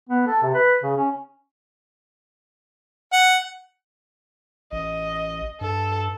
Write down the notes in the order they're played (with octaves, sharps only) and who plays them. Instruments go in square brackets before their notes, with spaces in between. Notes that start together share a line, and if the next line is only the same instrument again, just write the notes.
[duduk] B3
A4
C3
B4
C#3
C#4
[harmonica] F#5
[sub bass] A1 [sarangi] D#5
[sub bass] G2 [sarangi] A4